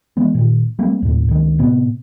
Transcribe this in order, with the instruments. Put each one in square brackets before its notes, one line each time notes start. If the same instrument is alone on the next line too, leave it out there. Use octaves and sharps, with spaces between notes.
[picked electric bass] E3 G#3 B3
A#2 D#3
G3 A3 A#3 C4
D#2 A2
C#2 D#3
A2 C3 B3